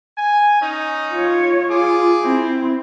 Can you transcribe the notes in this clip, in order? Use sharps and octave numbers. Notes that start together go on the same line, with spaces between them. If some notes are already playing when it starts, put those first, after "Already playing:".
G#5
C#4 D#4
F4 C#5
F4 G#4 D6
C4 E4